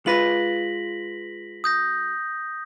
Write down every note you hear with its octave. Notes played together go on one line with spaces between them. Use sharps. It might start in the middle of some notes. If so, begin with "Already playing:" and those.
G#3 F4 B4 A#6 B6 F#7
D#6 G6 A#6